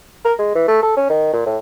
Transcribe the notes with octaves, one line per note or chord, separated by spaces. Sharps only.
A#4
G#3
E3
A3
A4
C#4
D#3
A#2
A2